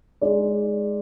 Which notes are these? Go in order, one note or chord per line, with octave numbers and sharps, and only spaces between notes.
G#3 D#4 G#4 D5